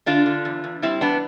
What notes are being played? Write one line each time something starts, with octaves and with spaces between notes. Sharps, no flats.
D3 D4 F4
D3
E2
E2
G3 C4 E4
E2 B3 D4